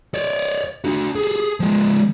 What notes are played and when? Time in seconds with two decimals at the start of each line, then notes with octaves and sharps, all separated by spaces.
0.14 C#5 D5
0.84 D4 F#4
1.15 G#4 A4
1.60 F3 G#3